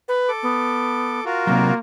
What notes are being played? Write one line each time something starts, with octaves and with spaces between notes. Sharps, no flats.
B4
A4 D6
B3
F4 F#4 A#4
C3 F#3 A#3